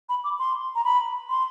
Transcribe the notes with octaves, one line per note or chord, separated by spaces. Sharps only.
B5
D6
C6
A#5
B5
C6